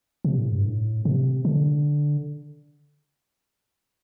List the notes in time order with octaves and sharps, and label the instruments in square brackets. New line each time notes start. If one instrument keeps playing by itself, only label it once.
[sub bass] C3
A2
G2
A2
C3
D3